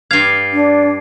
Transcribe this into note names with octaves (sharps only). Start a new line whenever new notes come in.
G2 F5 G#6 C7
D4